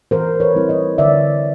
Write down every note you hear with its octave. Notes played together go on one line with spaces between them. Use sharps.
E3 A#4 C5
B4 C#5
G3 C4 E4
C#5 D#5
D3 D5 E5